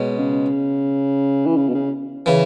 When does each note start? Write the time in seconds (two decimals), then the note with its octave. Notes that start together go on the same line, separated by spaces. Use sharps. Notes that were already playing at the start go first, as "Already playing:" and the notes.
Already playing: B2 G#3 C#4
0.19 C#3
1.46 E3
1.57 C#3
1.69 B2
1.74 C#3
2.26 C#3 E3